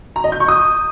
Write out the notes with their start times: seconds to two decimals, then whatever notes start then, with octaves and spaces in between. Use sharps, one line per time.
0.16 A#5
0.24 D#5
0.32 G6
0.40 C#6
0.48 D#6